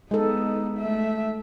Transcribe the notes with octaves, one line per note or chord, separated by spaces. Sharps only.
G#3 B3 D#4 A4
A3 E5